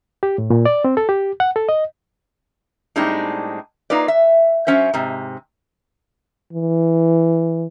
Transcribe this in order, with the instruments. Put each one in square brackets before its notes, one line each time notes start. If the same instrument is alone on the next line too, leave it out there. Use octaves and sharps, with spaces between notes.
[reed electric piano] G4
A2
A#2
D5
C4
A4
G4
F#5
A4
D#5
[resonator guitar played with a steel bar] A2 G3 G#3 C4 D4 D#4
A#3 D#4 F4 B4 D5
E5
F#3 C#4 C5 E5
G#2 C3
[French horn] E3